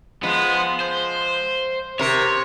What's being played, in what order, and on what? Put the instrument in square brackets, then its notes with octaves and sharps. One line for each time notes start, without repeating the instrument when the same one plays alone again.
[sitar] F3 G#3 [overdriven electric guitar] B3
[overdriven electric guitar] C5
[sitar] C3 A#4 [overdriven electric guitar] C#5